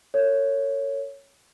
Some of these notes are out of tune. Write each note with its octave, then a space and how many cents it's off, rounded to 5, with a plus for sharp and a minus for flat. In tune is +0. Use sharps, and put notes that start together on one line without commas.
A#4 -45 C#5 +0